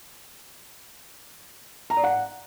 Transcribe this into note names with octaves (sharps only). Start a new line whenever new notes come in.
A#5
D5
F#5